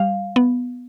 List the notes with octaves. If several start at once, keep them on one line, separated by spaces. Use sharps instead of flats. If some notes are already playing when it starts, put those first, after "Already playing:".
Already playing: G3 F5
B3